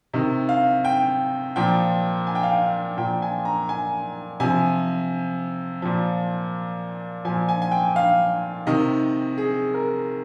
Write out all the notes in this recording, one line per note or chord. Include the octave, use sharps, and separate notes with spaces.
C3 D#3 D#5
F5
G5
A#2 F3 G5
G#5
G5
F5
G5
A#2 F3 G5
G#5
A#5
G#5
C3 F3 G#5
A#2 F3
A#2 F3 G#5
G#5
G#5
G5
F5
C3 D#3 D#5
G#4
A#4